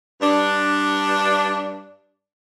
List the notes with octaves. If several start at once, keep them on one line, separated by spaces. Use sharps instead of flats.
G2 D4